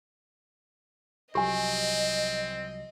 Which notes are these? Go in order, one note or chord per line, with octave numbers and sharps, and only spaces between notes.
C2 F3 F#3 C4 G4 D#5 G#5